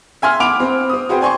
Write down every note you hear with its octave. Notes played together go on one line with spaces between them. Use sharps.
E5 G#5 C6 F6
F#5 B5 D6 D7 F7
C4
C4 D#6
F#4 G#4 B4 C5 G5
D5 G#5 C6 C#6